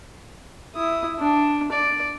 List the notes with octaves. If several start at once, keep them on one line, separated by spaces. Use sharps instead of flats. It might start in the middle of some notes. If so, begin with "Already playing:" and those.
E4 D#6
D4
D5